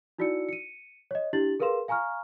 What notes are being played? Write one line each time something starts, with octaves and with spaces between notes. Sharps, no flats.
D#4 E4 F#4 D5 E6 C#7
C#7 D#7
C#5 D#5
D4 E4 G4 A6 F#7
G#4 A#4 B4 F5 C6 E7
F5 G#5 A#5 C#6 F6